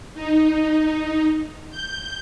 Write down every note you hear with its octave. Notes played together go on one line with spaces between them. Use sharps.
D#4
G6